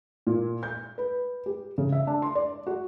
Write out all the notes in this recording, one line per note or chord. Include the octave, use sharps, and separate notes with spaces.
A#2
G6
B4
G4
C#3
E5
D4
C6
D5
F#4